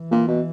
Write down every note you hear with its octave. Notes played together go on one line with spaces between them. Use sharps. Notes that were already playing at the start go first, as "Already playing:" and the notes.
Already playing: E3
A#2
B2